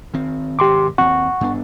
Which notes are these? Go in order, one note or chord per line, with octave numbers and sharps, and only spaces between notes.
D#3 C4
G#1 C3 G4 C6 D6
D#2 C4 F#5 C#6
G2 B3 D4